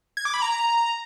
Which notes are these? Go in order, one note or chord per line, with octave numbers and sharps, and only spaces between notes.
G#6
D6
B5
A#5